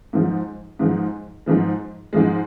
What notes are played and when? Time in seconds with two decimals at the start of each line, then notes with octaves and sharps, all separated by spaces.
0.13 G#2 F3 G#3
0.79 G#2 F3 G#3
1.46 G#2 F3 G#3
2.13 G#2 F3 G#3